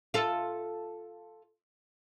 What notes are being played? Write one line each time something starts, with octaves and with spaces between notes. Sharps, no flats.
F4 A4